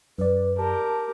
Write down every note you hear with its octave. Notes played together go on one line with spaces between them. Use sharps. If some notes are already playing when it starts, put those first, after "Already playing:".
F#2 B4 D5
G4 A#4 A5